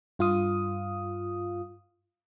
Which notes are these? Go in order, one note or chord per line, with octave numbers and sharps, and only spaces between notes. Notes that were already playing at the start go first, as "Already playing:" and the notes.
G2 F4 F5 D#6